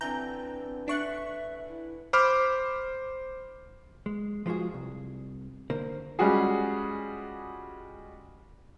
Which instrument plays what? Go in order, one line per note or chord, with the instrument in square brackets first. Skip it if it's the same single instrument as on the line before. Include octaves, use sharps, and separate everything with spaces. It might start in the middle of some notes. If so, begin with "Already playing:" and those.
[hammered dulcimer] D3 E3 [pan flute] C4 [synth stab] A#5 G6
[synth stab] D4 C#6 F#6 [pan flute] E5
[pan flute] E4
[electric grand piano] C5 B5 D6 F6
[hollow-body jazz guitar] G#3
F3 G#3 F4 F#4 G#4
C2
D3 A#3 A#4 C5
[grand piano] G3 G#3 C#4 F4 F#4 G#4